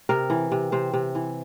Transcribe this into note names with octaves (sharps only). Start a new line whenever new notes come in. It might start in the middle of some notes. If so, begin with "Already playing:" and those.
C3 A#4
E3
C3
C3 C5
C3
E3